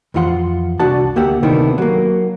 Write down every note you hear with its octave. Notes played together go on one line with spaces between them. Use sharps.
F2 E3 F4 F#5 C6
C2 D4 F#4 A5
D2 A#3 G4 E5 F#5
C3 D#3 A3 B3 D4 E4
F#3 A#3